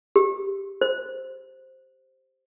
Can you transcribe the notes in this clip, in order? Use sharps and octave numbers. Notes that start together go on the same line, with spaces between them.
G4
C5